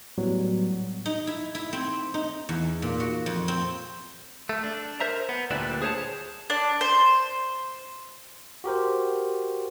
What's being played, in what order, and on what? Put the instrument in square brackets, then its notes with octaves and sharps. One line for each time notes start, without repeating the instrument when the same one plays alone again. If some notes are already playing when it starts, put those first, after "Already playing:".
[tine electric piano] A2 F#3 G3 B3
[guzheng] D#4
E4
E4
C4
D#4
E2
A#2
F#4
F2
C4
[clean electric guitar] A3
D4
A#4 C5 E5 A#5
B3
D2 A#2 G3 D4 E4 B4
G#4 C5 C#5 G#5 A5
[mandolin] D4
C5
[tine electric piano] F#4 G4 A#4 C5